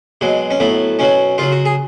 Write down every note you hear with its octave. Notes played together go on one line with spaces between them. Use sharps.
B2 F#3 G#3
C#4
A2 F#3 B3
B2 F#3 C#4
C#3 F#3 F4
F#4
G#4